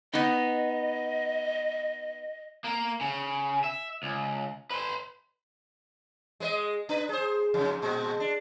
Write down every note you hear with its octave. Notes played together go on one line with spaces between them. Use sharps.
B3 D#4 D#5
A#3 A#4
C#3
E5
C#2
B4 C6
G#3 B4 D#5
D4 B4
G#4 C5
F2 G#2 C#3
A#2 G#3
D4